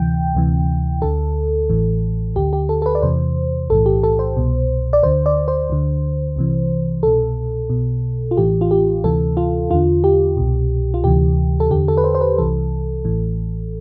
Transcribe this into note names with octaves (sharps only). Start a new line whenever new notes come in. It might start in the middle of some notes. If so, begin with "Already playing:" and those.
Already playing: D2 C3 E3 G5
D2 C3 E3
D2 D3 A4
A1 A2 E3
D2 D3 G4
G4
A4
A4
B4
D5
E2 C3 E3 C5
B1 A2 E3 A4
G4
A4
C5
C2 B2
D5
D2 D3 C5
D5
C5
D2 D3
C2 C3 E3
C2 B2 A4
B1 B2
F4
A1 A2 E3 G4
F4
G4
D2 C3 E3 A4
F4
E2 D3 F4
G4
C2 B2
F4
D2 C3 E3 G4
A4
E2 D3 G4
A4
B4
C5
C5
B4
C2 C3 E3 A4
A1 A2 E3